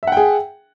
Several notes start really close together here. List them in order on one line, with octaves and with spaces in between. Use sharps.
E5 F#5 G5 G#4